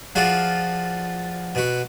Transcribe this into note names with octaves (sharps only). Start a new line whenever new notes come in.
F3 F4 F#4 G#4 D5
B2 F#4